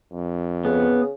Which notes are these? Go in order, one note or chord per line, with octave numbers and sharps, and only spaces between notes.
F2
C#3 B3